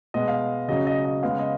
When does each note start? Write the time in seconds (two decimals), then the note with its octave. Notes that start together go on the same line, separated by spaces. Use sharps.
0.14 B2 G#3 B3 D#5
0.28 F5
0.68 C#3 F#3 C#4 D#5
0.87 D#5
1.05 D#5
1.23 C#3 G#3 B3 F5
1.39 D#5